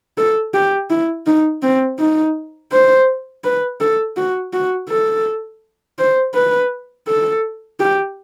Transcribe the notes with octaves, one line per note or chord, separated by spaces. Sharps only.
A4
G4
E4
D#4
C4
D#4
C5
B4
A4
F#4
F#4
A4
C5
B4
A4
G4